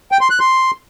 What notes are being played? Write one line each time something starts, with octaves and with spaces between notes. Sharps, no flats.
G5
C6
F#6
C6